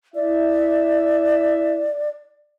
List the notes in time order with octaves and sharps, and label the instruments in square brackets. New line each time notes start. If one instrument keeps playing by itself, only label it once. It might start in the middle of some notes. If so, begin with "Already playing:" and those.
[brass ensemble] E4 E5 [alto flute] D5